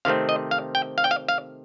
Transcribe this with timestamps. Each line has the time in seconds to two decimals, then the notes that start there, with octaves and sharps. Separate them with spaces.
0.05 C3 D#3 A3 C4 F5
0.29 D#5
0.51 F5
0.75 G5
0.98 F5
1.04 G5
1.11 F5
1.29 F5